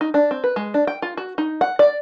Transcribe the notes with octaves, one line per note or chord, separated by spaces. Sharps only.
D#4
D4
C4
B4
G#3
D4
G5
F4
F#4
D#4
F#5
D5